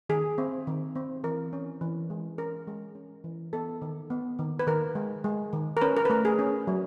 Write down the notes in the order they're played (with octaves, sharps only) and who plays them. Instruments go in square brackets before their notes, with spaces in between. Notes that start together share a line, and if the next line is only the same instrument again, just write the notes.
[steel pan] D#3 G#4
C4
D#3
C4
E3 A#4
C#4
E3
G#3
C#4 A#4
G#3
C#4
E3
B3 A4
D#3
B3
D#3
B4
D#3 A#4
G#3
G#3
D#3
A#4
C#4 B4
A#4
B4
A3 A#4
G#4
C#4
F#3